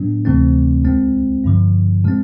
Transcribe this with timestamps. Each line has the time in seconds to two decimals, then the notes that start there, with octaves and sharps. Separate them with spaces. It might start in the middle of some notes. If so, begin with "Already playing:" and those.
Already playing: A2 F#3 B3 D4
0.25 D2 C3 E3 A3 C4
0.84 C2 B2 G#3 C4
1.44 G2 D3 F3
2.04 B2 G#3 C4